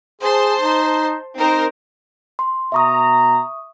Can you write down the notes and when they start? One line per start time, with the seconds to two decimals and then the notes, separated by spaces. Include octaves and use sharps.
0.21 G#4 C5 A5 C6
0.61 D#4
1.37 C4 D#4 A#4 C5
2.39 C6
2.72 B2 E5 A#5 C#6 D#6